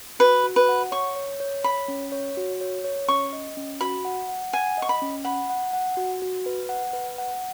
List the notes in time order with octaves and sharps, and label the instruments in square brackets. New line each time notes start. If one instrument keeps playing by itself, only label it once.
[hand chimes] F#4 [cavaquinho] B4
[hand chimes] F#4
[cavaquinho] B4
[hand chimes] F#5
[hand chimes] C#5 [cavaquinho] C#6
[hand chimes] C#5
C#5
[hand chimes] C#5 [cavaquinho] B5
[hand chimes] C#4
C#5
F#4
C#5
C#5
[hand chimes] C#4 [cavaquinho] C#6
[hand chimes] D#5
C#4
[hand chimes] F#4 [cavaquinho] B5
[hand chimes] F#5
F#5
[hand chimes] F#5 [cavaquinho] G#5
[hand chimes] D#5 [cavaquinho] C#6
[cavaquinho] B5
[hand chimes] C#4
[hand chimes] F#5 [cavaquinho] B5
[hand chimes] F#5
F#5
F#4
F#4
B4
F#5
B4
F#5